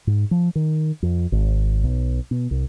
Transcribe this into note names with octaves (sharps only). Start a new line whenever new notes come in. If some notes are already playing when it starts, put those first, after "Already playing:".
G#2
F3
D#3
F2
G#1
B1
B2
C2